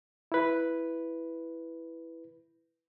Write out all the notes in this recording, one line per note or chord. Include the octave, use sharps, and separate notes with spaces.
E4 B4